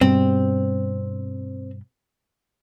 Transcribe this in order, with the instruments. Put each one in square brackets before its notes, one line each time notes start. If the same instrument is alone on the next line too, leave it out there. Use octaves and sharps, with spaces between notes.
[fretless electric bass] G2 B2 G3 [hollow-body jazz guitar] C4